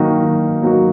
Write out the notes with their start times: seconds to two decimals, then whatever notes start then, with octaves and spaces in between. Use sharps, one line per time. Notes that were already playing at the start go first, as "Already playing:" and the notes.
Already playing: D#3 F#3 A#3 D#4 F#4
0.23 D#3
0.63 F#3 A#3 D#4 F#4